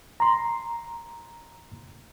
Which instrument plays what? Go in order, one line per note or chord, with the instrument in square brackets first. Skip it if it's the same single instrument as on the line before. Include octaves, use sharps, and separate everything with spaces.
[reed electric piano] A#5 C6